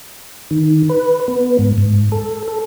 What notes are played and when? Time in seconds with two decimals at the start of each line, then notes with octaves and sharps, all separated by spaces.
0.51 D#3
0.89 B4
1.28 B3
1.59 G#2
1.78 G#2
2.12 A4
2.48 A4